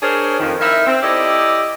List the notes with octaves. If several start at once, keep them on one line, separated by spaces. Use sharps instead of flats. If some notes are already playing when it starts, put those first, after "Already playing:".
D4 G#4 A#4 C5 C#5
F2 D#3
D#4 E4 A#4 E5
C4
E4 G4 A4 D5 D#5